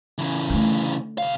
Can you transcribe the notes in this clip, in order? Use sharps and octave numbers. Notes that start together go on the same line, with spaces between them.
C#3 E3
D3 A3
C3 F5